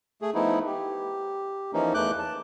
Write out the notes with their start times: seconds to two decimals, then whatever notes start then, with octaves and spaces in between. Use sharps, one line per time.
0.22 A3 G#4
0.34 F3 A3 B3 D#4 E4
0.66 G4
1.73 E3 F3 A#3 C#4 D#4
1.94 E2 E3 A3 D6 F#6 G6
2.19 A5